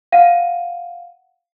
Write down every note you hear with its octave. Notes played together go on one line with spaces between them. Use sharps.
F5 F#5 D#7